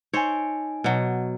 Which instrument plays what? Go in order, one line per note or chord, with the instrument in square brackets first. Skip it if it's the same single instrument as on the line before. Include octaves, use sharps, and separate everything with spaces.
[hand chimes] D#4 G#5 [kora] C5 C#5
[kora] B2 F#3